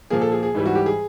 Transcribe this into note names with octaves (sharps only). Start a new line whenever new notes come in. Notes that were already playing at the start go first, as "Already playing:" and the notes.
A#2 F3 A#3 G#4
A4
G#4
G#4
G#2 E3 G3
F#4
G4
G#4